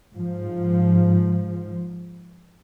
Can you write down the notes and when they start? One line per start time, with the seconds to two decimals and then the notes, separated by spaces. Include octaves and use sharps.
0.13 G#2 F3